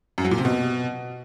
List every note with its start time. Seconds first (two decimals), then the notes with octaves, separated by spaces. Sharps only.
0.18 F#2
0.25 F#3
0.31 A#2
0.38 C3
0.45 B2